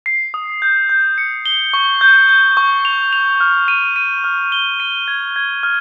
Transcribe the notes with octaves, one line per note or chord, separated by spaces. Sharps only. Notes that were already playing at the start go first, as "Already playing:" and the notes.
C7
D#6
G6
G6
C#7
G7
C#6
G6
G6
C#6
F7
F7
F6
D#7
D#7
F6
G7
D#7
G#6
G#6
F6